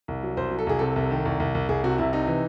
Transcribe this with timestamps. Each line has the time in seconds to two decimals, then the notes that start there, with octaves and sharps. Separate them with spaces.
0.08 C2
0.23 F#3
0.37 C2 C5
0.51 F#3
0.59 A4
0.67 C2 G#4
0.79 C3 A4
0.96 C2
1.11 D#3
1.25 C2
1.40 C2
1.55 C2
1.69 C2 G#4
1.84 C3 F#4
1.98 C2 E4
2.13 C3 D#4
2.27 E3